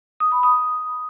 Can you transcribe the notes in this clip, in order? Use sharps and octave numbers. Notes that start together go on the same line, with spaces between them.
D#6
B5
D#6